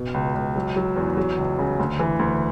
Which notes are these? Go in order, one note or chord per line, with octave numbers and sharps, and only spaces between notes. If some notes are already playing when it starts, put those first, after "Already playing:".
Already playing: B2
C#2
C#2
F#3
F#3
E2
F#3
C#2
C#3
D2
E3
D2